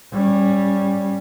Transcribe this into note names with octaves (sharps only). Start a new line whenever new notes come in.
G3 C#4